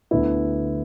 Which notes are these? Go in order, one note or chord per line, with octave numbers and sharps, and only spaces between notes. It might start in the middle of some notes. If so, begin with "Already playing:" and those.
D2 D3 B3 E4